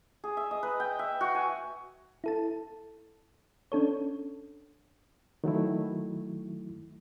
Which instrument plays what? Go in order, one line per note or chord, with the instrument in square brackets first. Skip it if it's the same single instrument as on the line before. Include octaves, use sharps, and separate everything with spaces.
[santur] G#4
E5
D#5
B4
G5
E5
F#4
G#5
[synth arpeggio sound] E4 A4 A5
C#4 D4 A4 C#5
[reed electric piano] D#3 F#3 A3 E4